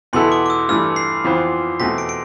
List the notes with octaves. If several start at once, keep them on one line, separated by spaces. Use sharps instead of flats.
E2 B2 B3 E4 A4 C6
D6
D6
E6
G2 E3 A3 F6
C7
F2 E3 B3 F4 C5
E2 B2 A3 C4 B6
D7
D7